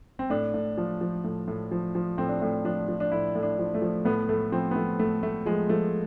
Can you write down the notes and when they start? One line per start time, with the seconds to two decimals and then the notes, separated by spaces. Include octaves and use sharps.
0.19 C4
0.30 A2 D4
0.54 A2
0.78 F3
1.01 F3
1.24 A2
1.48 A2
1.71 F3
1.95 F3
2.18 A2 C4
2.29 D4
2.40 A2 C4
2.65 F3 D4
2.88 F3
3.00 D4
3.12 A2 E4
3.35 A2
3.43 D4
3.59 F3
3.74 A3
3.82 F3
4.05 A2 B3
4.29 A2 A3
4.52 F3 C4
4.71 B3
4.76 F3 A3
4.99 A2 A3
5.23 A2 A3
5.46 F3 G#3
5.69 F3 A3